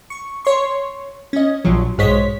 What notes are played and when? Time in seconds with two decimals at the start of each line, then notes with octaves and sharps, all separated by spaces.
0.10 C#6
0.45 C#5 C6 C#6
1.33 C#4 D#5
1.64 A#1 A#2 F3 F#3
1.98 B1 G#2 G#3 C5 C#5 B6